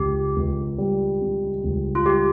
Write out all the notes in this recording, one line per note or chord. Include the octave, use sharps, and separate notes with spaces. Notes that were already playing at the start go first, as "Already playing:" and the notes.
Already playing: C#2 C#3 G4
C#2
G3
C#3
C#2
F4
G3 G4